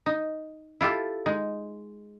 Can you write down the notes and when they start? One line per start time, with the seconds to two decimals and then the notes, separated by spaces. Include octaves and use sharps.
0.06 D#4
0.81 E4 F4 G4 A4
1.26 G#3 D#4